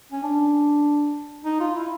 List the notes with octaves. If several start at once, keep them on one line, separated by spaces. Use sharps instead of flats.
C#4
D4
D#4
F4
E4